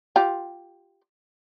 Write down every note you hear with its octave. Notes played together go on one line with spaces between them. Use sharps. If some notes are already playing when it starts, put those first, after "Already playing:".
F4 G4